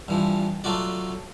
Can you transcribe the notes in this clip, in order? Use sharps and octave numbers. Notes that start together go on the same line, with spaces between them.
G2 E3 F3
F#3 A3 F4 F#4 D5